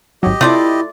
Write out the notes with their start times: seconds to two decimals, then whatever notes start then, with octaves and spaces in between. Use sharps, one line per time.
0.23 G#1 F#3 G4 D#5
0.41 C3 A3 E4 F4 D5